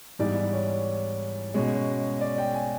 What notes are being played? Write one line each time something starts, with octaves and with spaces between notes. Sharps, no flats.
G#2 E3 G3 B3 D5
C#5
B2 G#3 C#4
D5
G5
G#5